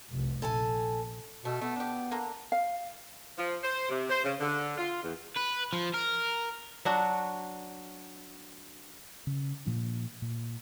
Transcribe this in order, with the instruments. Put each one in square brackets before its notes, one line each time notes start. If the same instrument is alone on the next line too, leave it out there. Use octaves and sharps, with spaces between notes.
[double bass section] F1 C2
[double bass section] A#1 [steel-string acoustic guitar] A4 G#5 A5
[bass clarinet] B2 [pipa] A3
[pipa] A3 [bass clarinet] B3
[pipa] D4 G4
D3 A#3 A#5
[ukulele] F5
[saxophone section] F3
C5
C3
C5
C#3
D3
F4
E2
[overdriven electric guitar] B4
F3
A#4
[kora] F#3 D4 F#4
[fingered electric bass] C#3
A#2 F3 D4
A#2